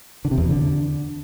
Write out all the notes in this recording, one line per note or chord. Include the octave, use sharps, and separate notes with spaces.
D3
C3
E2
B2
D3